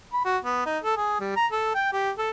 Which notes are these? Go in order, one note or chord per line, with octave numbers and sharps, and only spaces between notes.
B5
F#4
B3
D#4
A4
G#4
G3
A#5
A4
G5
G4
A4